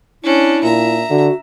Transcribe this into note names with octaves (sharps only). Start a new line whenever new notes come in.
C#4 D4 E4
A#2 E5 A#5
D3 F#4